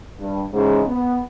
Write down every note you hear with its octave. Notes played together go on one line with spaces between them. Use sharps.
G2
G#2 C#3 E3 G#3
B3